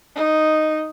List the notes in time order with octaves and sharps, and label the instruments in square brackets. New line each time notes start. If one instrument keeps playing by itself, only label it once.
[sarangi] D#4